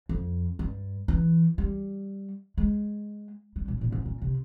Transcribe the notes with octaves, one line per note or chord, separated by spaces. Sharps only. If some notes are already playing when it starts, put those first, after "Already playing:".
F2
G2
E3
G3
G#3
G3
A#2
A#2
G#2
A#2
C3